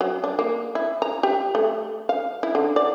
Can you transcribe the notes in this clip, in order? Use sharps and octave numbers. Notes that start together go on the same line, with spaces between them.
F#3
D4
A#3
E4
A#5
G4
A3
F5
E4
D3
D5